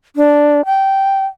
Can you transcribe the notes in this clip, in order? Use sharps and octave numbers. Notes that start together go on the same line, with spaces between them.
D4
G5